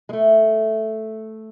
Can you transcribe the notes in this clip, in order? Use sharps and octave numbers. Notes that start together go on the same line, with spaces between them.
G#3
A3